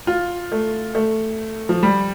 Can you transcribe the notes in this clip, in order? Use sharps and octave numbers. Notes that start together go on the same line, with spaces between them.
F4
A3
A3
F3
G3